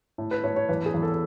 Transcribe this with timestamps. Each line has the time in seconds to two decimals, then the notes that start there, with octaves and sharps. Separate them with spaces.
0.18 A2
0.31 B4
0.44 A2 C#5
0.56 C#5
0.69 E2 B4
0.86 G#4
0.94 E2
1.02 A4